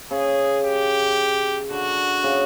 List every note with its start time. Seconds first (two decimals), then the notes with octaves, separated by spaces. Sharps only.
0.11 C#3 G#4
0.64 G4
1.70 D3 F#4
2.24 C#3